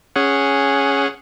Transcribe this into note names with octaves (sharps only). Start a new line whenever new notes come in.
C#4 G#4 F#5